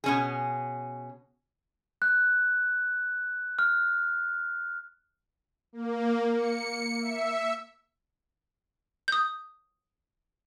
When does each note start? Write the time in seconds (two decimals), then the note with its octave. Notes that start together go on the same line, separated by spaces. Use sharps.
0.04 B2 C#4 G#4
2.02 F#6
3.59 F6
5.73 A#3
6.36 C#7
7.00 E5
9.08 D#6 G6